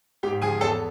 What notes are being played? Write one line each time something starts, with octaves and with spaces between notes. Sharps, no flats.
G#2 G4 G5
F3 G#4 G#5
E2 A4 A5